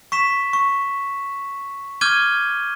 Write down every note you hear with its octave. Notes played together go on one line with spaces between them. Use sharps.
C#6 B6 E7
C#6
D6 F6 G6 G#6 D#7 G7